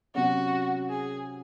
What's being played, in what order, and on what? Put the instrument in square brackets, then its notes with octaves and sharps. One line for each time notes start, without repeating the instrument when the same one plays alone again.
[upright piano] C3 F#3 C#4 [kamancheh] F#4
[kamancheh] G#4